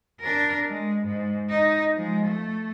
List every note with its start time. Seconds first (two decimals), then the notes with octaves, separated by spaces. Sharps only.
0.20 D4 A#4
0.66 G#3
1.05 G#2
1.50 D#4
1.95 F3 G#3
2.25 A3